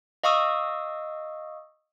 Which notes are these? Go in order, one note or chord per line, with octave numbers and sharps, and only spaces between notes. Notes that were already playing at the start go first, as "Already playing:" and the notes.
D#5 F5 C#6 D#6 E6